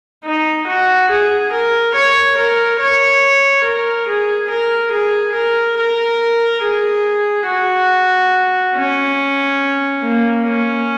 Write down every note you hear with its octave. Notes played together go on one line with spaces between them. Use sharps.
D#4
F#4
G#4
A#4
C#5
A#4
C#5
A#4
G#4
A#4
G#4
A#4
A#4
G#4
F#4
C#4
A#3
C#4